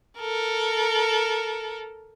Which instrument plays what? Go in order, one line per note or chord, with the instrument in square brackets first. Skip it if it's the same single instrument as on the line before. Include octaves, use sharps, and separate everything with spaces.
[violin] A4 A#4